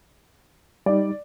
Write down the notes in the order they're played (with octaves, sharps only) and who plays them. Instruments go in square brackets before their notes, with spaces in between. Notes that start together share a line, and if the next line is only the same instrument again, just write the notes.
[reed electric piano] G3 D#4 [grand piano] D5